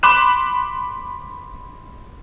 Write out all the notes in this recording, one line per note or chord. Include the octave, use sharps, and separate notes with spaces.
B5 C6 D6 F#6 E7